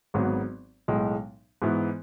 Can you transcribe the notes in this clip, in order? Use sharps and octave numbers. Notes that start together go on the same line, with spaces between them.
G#1 G#2 F#3 B3
B1 A2 G#3
G#2 E3 B3 E4